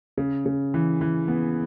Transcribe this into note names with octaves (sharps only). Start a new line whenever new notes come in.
C#3
C#3
E3
E3
B3